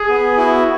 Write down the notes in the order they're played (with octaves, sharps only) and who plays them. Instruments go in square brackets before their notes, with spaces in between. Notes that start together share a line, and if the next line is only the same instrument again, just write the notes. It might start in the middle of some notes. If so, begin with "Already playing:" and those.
Already playing: [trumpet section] G#4
[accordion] B3
[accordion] E4 [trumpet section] F#4